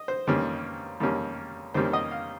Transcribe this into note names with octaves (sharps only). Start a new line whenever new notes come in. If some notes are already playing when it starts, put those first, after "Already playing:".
Already playing: D#5
C5
F2 D#3 G3 A#3 C#4
F2 D#3 G3 A#3 C#4
F2 D#3 G3 A#3 C#4 C5
D#5
F5